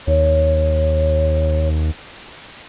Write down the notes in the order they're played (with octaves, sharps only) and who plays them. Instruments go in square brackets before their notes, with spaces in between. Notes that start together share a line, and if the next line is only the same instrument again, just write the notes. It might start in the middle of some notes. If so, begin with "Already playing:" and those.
[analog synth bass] D#2 [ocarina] C#5